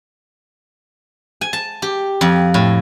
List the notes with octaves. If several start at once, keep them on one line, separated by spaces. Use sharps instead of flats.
G#5
A5
G4
F2
A2